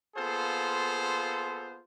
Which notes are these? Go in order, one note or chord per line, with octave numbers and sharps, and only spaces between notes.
A#3 B3 F4 G#4 A4 C5